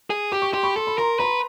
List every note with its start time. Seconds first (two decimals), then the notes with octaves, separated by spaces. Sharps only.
0.10 G#4
0.32 G4 D6
0.42 C#6
0.52 G4 C6
0.63 B5 C#6
0.76 A4 C6
0.87 B5
0.98 A#4 A#5 C6
1.19 B4 A#5 C6